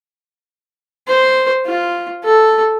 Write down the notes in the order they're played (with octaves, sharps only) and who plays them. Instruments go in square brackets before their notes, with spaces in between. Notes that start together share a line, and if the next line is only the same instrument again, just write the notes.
[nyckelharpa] C5
F4
A4